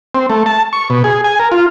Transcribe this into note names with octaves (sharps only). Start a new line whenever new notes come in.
C4
A3
A5
C#6
B2
G#4
G#5
A#4
F4